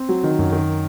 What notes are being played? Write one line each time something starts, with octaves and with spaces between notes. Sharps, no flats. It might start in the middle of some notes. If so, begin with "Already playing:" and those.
Already playing: C4
F#3
D#3
F#2
D#3